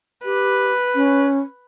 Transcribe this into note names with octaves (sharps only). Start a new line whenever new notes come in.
G4 B4
C#4